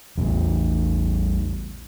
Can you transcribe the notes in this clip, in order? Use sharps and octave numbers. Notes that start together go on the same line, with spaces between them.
A1 E2